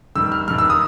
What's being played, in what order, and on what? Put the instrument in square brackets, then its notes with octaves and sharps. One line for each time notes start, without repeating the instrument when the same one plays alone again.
[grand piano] G2 D#3 G3 E6
F6
G2 D#3 G3 F6
E6
D#6